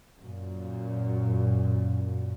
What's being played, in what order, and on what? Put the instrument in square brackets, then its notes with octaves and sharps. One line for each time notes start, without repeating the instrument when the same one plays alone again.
[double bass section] F#2 A#2